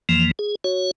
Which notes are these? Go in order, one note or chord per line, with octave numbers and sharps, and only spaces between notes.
F2 E3 F3 A#3
G#4
F#4 C#5